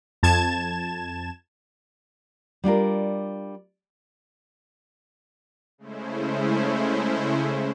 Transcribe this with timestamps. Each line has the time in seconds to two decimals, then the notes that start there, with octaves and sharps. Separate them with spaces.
0.23 F2 A5 G#6 E7
2.64 G3 D4 F4 A#4
5.78 C#3 G#3 A3 C#4 E4 C5